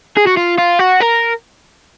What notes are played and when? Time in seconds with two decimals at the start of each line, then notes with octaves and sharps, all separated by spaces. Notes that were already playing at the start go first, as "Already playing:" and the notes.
0.17 G#4
0.27 F#4
0.37 F4
0.58 F4
0.79 F#4
1.01 A#4